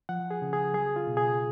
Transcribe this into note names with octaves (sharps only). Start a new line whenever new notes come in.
F3 F#5
G#4
C#3
G#4
F#3 G#4
F4
B2
G#4